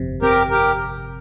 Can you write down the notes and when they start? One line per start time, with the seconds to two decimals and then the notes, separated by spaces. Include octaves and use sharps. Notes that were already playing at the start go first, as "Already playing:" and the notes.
Already playing: G1 F2 C3
0.22 C3 G4 A#4
0.51 G4 A#4